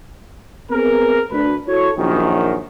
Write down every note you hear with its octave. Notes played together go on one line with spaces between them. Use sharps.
B3 C4 G#4 A#4
D2 D4 B4
E4 F#4 A4 C#5
A#1 F#2 D#3